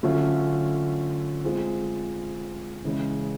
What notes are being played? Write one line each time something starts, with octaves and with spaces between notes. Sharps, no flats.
D3 F#3 A3 C#4 F4
G#3 C4 F4 G#4 C5
C#3 E3 G#3 C#4